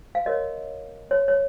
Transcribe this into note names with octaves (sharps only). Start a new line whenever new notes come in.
F5
F#4 A#4 C#5 D#5
C#5
C#5